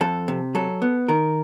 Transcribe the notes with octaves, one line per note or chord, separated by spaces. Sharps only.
F2 A4
C3
F#3 A4
B3
D#3 A#4